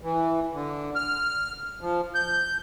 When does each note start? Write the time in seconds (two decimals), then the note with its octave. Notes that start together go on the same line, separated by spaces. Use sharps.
0.01 E3
0.53 D3
0.95 F6
1.81 F3
2.15 G6